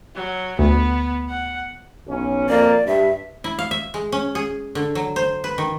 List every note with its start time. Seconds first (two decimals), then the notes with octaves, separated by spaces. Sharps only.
0.15 F#3
0.59 D2 B3
1.29 F#5
2.07 B1 C#4
2.49 F2 A#3 D5
2.87 G2 E5
3.44 E4
3.59 F5
3.71 E5
3.94 G#3
4.12 C#4
4.35 G#4
4.75 D3
4.95 F#3
5.16 C5
5.44 B4
5.58 D#3